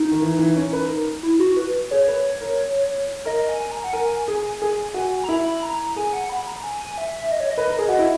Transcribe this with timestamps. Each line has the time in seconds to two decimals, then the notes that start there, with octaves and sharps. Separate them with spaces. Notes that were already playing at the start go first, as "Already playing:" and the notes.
Already playing: D#4
0.11 D#3
0.22 E3
0.39 E3
0.56 C#4
0.73 B4
0.89 A#4
1.23 E4
1.40 F#4
1.57 B4
1.91 G#4 C#5
2.08 B4
2.41 A#4
3.25 A#4 D#5
3.49 G#5
3.72 A#5
3.84 F#5
3.93 A#4 G#5
4.28 G#4
4.62 G#4
4.94 F#4
5.24 A#5
5.29 E4 B5
5.62 A#5
5.96 G#4 G#5
6.13 F#5
6.29 B5
6.47 A#5
6.63 G#5
6.81 G#5
6.98 E5
7.15 E5
7.32 D#5
7.40 C#5
7.50 D#5
7.58 B4
7.69 A#4
7.79 G#4
7.89 F#4
7.99 E4